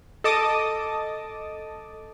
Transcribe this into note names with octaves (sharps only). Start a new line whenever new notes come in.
A4 D#5 A5 D6 D#6